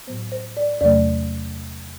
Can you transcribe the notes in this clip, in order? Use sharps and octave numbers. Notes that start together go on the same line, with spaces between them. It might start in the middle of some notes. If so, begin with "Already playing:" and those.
A2 F#3 B3 C5
C5
D5
E2 C3 F#3 A3 D5